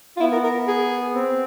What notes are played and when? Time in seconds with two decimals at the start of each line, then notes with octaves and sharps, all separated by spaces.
0.17 F4
0.20 B3 E4
0.32 A#4
0.44 A#4
0.68 G#4
1.15 C4